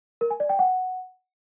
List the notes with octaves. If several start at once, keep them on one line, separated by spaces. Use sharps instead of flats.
A#4
G#5
D5
G5
F#5